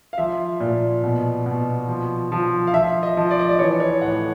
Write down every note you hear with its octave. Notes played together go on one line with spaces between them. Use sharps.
F5
F3 E5
A#2
B2
B2
F3
F3
F5
F3 E5
D#5
F3
D5
D#5
D5
E3 C#5
C#5
A2 F#5